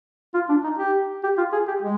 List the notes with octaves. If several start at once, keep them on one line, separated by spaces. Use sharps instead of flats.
F4
D4
D#4
G4
G4
F4
G#4
G4
G#3